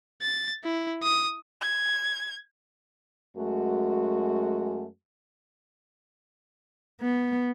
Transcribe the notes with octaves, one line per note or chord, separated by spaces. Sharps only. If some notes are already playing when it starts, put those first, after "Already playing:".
A6
E4
D#6
G#6
F#2 G#3 A3 F#4
B3